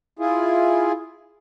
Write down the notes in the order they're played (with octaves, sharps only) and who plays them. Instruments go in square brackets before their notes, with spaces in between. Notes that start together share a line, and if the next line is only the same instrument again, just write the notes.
[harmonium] E4 F4 G#4